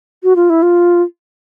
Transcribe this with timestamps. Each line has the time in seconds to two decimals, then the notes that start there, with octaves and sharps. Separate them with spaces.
0.23 F#4
0.36 F4
0.50 E4
0.62 F4